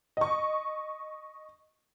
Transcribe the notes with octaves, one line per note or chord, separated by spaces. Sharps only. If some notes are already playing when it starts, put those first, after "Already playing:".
D#5 C#6